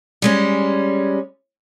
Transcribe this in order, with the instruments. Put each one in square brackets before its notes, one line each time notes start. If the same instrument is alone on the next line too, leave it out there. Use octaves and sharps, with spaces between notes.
[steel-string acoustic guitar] G3 G#3 C#4